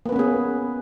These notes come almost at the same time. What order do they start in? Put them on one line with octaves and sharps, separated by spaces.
A#3 B4 C#4 B3 G#4